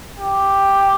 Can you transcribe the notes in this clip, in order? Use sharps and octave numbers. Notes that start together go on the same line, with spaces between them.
G4